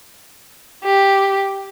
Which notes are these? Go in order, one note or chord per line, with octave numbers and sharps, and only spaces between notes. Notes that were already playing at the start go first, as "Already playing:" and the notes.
G4